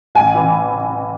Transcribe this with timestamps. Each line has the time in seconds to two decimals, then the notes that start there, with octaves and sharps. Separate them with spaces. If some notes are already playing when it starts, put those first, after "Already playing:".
0.15 A1 G#5
0.35 E3